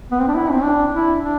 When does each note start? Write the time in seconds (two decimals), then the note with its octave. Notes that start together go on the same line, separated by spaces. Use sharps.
0.12 B3
0.19 C4
0.28 D4
0.35 E4
0.52 C4
0.64 D4
0.93 E4
1.21 D4